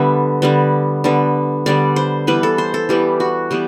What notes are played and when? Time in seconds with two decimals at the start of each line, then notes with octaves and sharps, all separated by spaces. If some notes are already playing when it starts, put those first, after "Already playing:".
Already playing: D3 G3 B3 E5
0.42 D3 G3 B3
1.04 D3 G3 B3
1.66 D3 G3 B3 D5
1.96 C5
2.27 E3 G3 B3 B4
2.43 A4
2.58 C5
2.74 A4
2.89 E3 G3 B3 G4
3.20 F#4
3.51 E3 G3 B3 G4